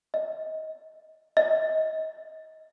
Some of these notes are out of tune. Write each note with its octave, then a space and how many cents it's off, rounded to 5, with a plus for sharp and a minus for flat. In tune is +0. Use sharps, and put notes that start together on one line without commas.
D#5 +20
D#5 +25